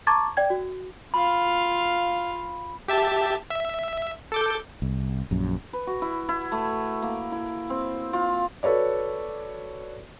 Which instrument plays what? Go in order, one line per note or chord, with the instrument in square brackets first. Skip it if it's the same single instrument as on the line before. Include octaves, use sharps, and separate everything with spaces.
[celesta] A5 A#5 C#6 D6 G#6 A6
D5 G5 G#6
F#4
[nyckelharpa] F4 F5 [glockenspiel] B5
[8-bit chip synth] G4 E5 A5
E5
A4 D6 G6
[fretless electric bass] C2
A#1 F#2
[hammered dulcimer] B4
F#4
E4
E4
A3
A#3
E4
C4
F4
[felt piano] F#4 A4 B4 C#5 D5